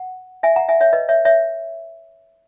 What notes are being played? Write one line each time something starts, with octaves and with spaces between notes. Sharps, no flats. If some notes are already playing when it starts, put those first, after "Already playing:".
Already playing: F#5
E5 G#5
F#5 A#5
E5 G#5
C#5 E5
B4 D#5
C#5 E5
C#5 E5